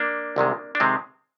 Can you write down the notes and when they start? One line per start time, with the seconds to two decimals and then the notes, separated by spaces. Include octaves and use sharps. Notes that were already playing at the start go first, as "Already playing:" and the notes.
Already playing: A#3 D4
0.36 C2 C3 D#3 G#3
0.75 D4
0.80 C3 D#3 G#3 C4